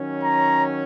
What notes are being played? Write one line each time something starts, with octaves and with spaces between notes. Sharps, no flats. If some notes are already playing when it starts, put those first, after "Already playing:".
Already playing: D#3 F#3 C#4
A#5